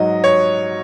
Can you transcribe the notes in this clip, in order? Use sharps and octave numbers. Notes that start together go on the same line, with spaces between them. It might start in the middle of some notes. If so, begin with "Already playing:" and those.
Already playing: G#2 F#3 D#5
C#5